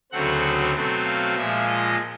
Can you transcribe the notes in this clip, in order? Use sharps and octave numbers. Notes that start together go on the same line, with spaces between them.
D2 C#3 F#3 A3 C4 F#5
B2 F#3 A3 C4
F5
A#2 F3 G#3 E5
D#5